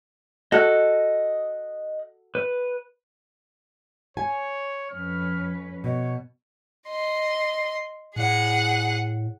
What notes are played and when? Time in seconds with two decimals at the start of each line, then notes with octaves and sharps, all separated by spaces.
0.52 F#4 A4 D#5 F#6
2.35 B4
4.17 C#5 G#5
4.91 F2 C#4 B4 F6
5.84 B2 C#5
6.88 D#5 C6
8.16 A2 G#4 F#5